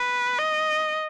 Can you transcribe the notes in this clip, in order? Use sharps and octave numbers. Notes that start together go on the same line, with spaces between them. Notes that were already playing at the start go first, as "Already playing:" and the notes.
Already playing: B4
D#5